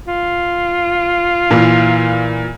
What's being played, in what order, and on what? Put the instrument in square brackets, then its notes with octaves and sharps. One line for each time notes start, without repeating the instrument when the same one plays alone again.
[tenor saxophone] F4
[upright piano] A#2 E3